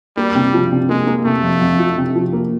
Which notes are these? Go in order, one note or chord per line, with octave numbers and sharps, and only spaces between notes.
G3 A#3
C3
F3
C3
G#3 A#3
A#3
C3 A3
F2
F2
F3
C3
F3
A#3